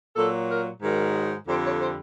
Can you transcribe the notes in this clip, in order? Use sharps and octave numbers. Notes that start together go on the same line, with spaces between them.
A#2 F#3 A4
A#4
G#2 D#3 F#3 A#4
F2 D3 G3 C5
C#5
C5